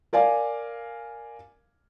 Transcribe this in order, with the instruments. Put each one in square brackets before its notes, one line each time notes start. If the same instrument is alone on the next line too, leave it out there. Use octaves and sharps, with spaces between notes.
[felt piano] A#4 D5 F5 G#5